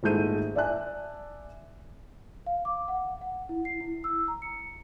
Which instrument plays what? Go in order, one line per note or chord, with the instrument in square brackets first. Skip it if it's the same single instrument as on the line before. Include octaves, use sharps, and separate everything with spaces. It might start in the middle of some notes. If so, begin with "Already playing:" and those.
[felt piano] D#1 G#2 G#3 A3 G6 D#7
D5 E5 G#5 A5 F#6
[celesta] F5
D6
F#5
F#5
E4
C7
E4
E6
A#5
C#7